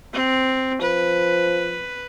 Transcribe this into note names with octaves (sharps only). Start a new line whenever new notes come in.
C4
F3 B4